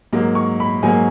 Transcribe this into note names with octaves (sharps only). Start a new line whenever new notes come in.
G#2 F#3 A#3
C#6
B5
G#2 F#3 A#3 G#5